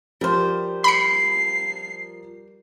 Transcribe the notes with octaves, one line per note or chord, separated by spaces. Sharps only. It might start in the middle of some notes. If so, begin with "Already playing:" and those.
F3 G3 A#4 C5 F6
B5 C7 C#7